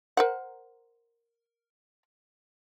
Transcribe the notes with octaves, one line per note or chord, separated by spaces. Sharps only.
A#4 C5 F#5